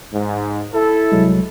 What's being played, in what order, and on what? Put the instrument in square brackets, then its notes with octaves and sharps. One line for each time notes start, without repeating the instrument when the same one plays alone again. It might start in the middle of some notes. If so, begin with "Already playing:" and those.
[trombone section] G#2
E4 A4
[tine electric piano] C2 F#3 G#3